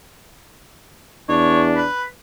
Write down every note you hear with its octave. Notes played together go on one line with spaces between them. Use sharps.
E2 D4 C#5
B4